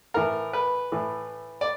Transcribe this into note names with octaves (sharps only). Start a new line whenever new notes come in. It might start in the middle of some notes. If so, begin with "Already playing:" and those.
A2 E3 A#4
B4
A2 E3
D5